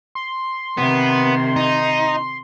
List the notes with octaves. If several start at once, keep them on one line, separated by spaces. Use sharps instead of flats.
C6
C3 D#3 B3
D#4